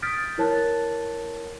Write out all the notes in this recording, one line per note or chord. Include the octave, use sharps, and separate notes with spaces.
D#6 F6 G6 A6 B6 D7
E4 A#4 C#5 A5 F#6 A6